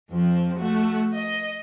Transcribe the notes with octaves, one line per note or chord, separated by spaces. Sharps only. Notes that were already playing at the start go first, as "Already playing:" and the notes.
F2 F3 C4
A3 F#4
D#5